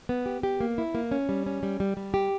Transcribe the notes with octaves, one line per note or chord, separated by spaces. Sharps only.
B3
G4
G4
A#3
E4
A#3
C#4
G3
C#4
G3
G3
G3
G4